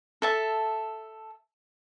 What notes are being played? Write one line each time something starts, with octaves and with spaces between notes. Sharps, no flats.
A4 E5 A5